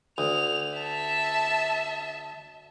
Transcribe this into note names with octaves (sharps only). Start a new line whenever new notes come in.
D2 F7
E5 A5